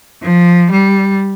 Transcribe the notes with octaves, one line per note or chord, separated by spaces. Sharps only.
F3
G3